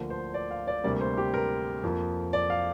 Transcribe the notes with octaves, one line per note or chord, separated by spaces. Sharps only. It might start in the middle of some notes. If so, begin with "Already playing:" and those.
Already playing: D2 D3 F3 A#3
C5
D5
F5
D5
D2 C3 G3 A#3 D5
C5
G4
A#4
F2 F3 A#3
D5
F5